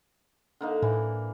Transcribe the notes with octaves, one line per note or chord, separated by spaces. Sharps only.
D3 A#3 D#4
A2 E3